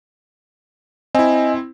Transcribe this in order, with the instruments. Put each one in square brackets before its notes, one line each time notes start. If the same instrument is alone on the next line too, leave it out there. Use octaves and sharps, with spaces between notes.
[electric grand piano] C4 E4 [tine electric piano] D#5 G#5